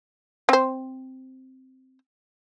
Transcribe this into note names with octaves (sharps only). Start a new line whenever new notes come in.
C4 C5